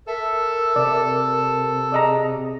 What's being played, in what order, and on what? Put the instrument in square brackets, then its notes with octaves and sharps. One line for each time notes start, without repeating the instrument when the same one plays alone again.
[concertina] A4 [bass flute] A#4 [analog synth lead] E5
[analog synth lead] C3 [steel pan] D5
[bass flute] G#4 [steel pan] D5 D#5 A#5